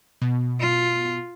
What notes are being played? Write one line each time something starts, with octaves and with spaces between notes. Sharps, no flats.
B2
F4